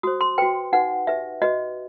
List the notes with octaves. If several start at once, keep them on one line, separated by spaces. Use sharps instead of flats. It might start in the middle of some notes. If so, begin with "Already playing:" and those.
F#4 C5 D#6
C6
F#4 B4 G5
D#4 F#4 B4 F#5
D#4 G4 B4 E5
F#4 B4 D#5